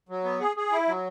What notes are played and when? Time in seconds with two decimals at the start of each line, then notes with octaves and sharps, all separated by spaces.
0.09 F#3
0.24 B3
0.40 G#4
0.57 G#4
0.72 E4
0.88 F#3